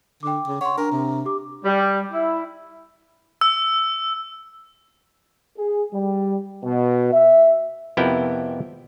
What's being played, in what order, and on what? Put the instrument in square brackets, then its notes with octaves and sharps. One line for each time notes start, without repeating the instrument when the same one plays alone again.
[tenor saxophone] D3 [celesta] G5 D6
[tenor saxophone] C#3
[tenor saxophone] C#5 [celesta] F#5 C6
[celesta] D4 A#5 [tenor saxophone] A#4
[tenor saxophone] C3
[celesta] G4 D6
[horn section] G3
E4
[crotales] E6
[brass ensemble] G#4
G3
B2
E5
[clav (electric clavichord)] F2 C3 B3 E4 A#4 G5